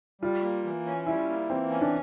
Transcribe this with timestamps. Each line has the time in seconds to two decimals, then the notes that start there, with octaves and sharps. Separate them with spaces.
0.21 G3 F4
0.43 A#3
0.64 E3
0.86 C#4
1.06 G3 E4
1.29 A#3
1.49 E3 C4
1.70 C#4
1.81 D4